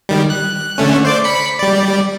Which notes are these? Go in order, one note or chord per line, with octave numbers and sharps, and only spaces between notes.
D#3 G3
F#6
D3 A3 C#4
C5 D5 D6
B5 C#7
G3 D5